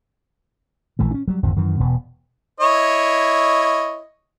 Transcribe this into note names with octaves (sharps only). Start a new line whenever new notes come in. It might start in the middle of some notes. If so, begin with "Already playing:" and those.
A#1 E3 A3
C#4 D4
F#3 G3
G#1 F2 D3 F3
F#2 D#3 E3
E1 B2 B3
E4 C#5 D#5